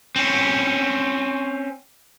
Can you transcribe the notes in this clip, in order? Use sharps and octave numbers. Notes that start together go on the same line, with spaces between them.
C4 C#4